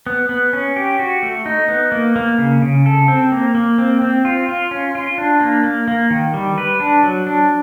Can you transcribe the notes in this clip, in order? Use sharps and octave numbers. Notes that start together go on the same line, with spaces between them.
B3
B3
C#4
G4
F#4
A3
D#4
B3
A#3
A#3
C#3
C#3
A4
C4
A#3
A#3
C4
C4
F4
F4
C#4
F4
D4
A#3
A#3
A#3
D#3
G3
B4
D4
F#3
D4